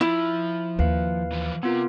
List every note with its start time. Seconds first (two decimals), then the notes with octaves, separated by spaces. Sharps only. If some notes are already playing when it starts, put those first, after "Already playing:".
0.01 F3 E4 B5
0.79 D#2 B4 F5
1.32 E3 F3
1.63 C3 B3 F4 A#4